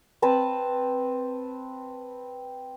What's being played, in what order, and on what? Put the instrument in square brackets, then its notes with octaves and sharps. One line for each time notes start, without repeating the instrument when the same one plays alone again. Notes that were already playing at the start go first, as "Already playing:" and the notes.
[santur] C4 B4 A5 B5